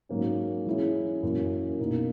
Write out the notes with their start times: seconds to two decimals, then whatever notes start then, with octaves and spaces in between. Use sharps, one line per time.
0.09 G#2 F#3 A#3 C#4
0.66 E3 G#3 C#4 E4 G#4
1.23 F#2 E3 A#3 C#4
1.79 B2 A#3 D#4 A#4